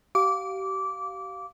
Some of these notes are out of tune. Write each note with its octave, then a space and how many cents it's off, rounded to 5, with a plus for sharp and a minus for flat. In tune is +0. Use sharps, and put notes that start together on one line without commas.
G4 -35 F5 +5 D6 -15